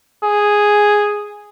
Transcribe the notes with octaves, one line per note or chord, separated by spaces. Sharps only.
G#4